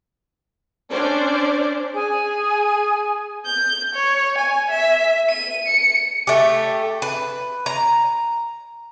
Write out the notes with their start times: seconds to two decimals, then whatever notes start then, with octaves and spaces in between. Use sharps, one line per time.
0.91 C#4 D4 C5 D5
1.95 G#4 G#5
3.46 G6
3.95 C#5
4.38 G#5
4.71 E5
5.29 D#7
5.67 C#7
6.27 A3 G4
7.02 B4
7.66 A#5